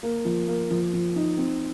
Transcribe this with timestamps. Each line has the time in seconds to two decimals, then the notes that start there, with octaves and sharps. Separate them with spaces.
0.03 A#3
0.25 F3
0.48 A#3
0.70 F3
0.93 F3
1.16 D#4
1.38 C4